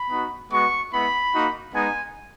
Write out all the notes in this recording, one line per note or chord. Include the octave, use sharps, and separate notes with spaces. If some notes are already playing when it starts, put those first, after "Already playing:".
Already playing: B5
B3 D#4 F#4
G#3 B3 F#4 C#6
G#3 B3 E4 B5
A#3 D#4 F#4
G#3 B3 D#4 G#5